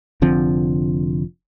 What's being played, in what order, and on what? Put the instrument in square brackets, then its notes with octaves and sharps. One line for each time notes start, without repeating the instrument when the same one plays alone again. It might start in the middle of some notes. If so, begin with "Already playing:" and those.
[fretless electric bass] F1 D3 F3 C4